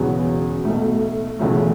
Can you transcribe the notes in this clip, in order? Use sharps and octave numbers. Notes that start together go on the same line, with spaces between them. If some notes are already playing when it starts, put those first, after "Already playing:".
Already playing: E1 E2 C#3 F#3 B3
B1 B2 A3
E1 E2 C#3 F#3 A3